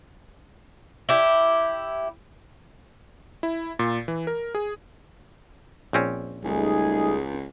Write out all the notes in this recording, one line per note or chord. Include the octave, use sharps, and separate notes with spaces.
E4 G4
E4
A#2
E3
A#4
G#4
A#1 C4 C#4
C#2 G3 A3 D#4 G#4